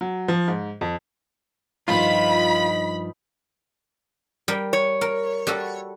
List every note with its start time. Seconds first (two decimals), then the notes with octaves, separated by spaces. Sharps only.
0.01 F#3
0.28 F3
0.48 G#2
0.81 F2
1.88 G2 D#3 F3 D#4 F4 B5 B6
4.48 G3 A#4
4.73 C#5
5.01 A#4
5.47 G3 F#4 A4